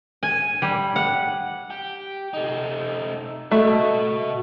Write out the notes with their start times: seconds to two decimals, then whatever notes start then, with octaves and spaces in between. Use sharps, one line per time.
0.23 G#5
0.62 G3
0.96 F#5
1.71 G4
2.33 A3 D#4
3.52 A3 F#4 D#5